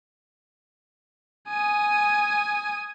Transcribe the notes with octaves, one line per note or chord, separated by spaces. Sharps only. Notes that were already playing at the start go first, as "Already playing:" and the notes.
G#5 D#6